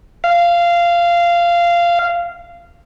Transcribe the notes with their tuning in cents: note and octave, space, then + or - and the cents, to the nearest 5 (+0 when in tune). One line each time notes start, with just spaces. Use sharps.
F5 -15